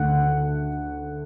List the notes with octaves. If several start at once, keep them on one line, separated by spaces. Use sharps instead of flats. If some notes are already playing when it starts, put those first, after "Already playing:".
Already playing: D2 D3 A3 F#5